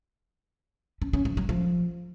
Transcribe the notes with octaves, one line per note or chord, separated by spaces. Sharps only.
C#4
C#4
F3
F#3
F3